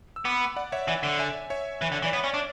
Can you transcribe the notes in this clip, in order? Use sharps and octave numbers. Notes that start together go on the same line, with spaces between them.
E6
B3 B5 D6
D5 F#5
C#5 E5
E3 D5 F#5
D3
E5 G#5
C#5 E5
E3
D3
E3 D5
B3 C#5
C#4
D4